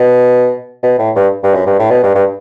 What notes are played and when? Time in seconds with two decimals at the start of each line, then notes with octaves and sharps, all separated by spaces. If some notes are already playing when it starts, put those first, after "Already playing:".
Already playing: B2
0.83 B2
0.98 A2
1.16 G2
1.43 G2
1.54 F#2
1.66 G2
1.79 A2
1.90 B2
2.03 G2
2.15 G2